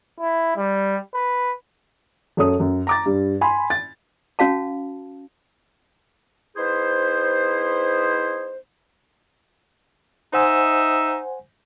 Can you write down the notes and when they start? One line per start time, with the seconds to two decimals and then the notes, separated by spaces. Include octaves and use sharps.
0.20 E4
0.57 G3
1.14 B4
2.37 F#2 A4 C#5 D#6
2.60 F#2
2.87 A#5 D6 A6
3.06 G2
3.41 G#5 B5 C6
3.70 A6
4.39 C#4 F#4 F5 A5
6.57 B3 D#4 E4 G#4 C5
10.33 D#4 C5 D#5 E5 F#5 G#5